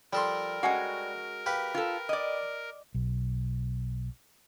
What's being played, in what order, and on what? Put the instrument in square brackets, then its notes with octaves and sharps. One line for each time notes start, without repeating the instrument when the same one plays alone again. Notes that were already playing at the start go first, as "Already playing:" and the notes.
[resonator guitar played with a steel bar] F3 [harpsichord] G3 A4 C6 [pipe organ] A#4
[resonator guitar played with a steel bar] G#3 C#4 F#4 [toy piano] F#5 G#5
[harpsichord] G4 B4 F5
[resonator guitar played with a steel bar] F4 A4
D5 D#5
[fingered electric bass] B1